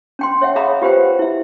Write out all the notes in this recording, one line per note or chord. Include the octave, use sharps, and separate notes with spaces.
C#4 G5 C6
C#5 E5 F#5 G5
G#4 E5 F5 A#5 B5 D#6
F4 G4 B4 C5 F#5 G5
E4 E5